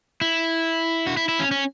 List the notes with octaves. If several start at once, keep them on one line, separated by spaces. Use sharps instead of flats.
E4
F#4
E4
E4
C#4
C#4